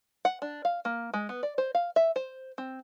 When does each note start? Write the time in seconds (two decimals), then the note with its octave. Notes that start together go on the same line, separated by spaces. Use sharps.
0.25 F#5
0.42 D4
0.65 F5
0.85 A#3
1.14 G#3
1.29 B3
1.43 D5
1.58 C5
1.75 F5
1.96 E5
2.16 C5
2.58 C4